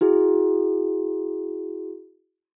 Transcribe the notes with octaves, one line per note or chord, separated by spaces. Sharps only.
E4 F#4 G#4